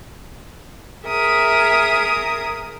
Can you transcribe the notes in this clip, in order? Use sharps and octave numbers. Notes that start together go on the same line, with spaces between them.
G#4 A#4 E5 D#6